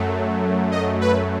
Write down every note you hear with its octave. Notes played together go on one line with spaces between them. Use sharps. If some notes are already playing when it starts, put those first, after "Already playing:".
Already playing: F#2 F#3 A3
D#5
B4